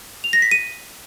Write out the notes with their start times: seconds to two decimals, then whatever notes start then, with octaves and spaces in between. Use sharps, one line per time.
0.24 F7
0.33 A#6
0.42 B6
0.51 D#7